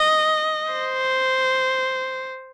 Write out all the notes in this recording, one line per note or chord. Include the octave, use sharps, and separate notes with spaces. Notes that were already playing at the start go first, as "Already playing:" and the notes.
Already playing: D#5
C5